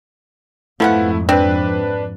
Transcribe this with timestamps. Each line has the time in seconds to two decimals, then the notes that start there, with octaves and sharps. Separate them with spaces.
0.80 F2 G#2 F3 A3 B3 E4 F#5
1.29 C4 D4 B4